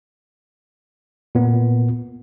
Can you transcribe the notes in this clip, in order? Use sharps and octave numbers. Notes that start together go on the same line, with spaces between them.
A#2 B3